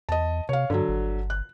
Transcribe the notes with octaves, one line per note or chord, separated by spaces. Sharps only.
E2 D#5 A5
C3 C#5 F5
G2 D3 F#3
G1
F#6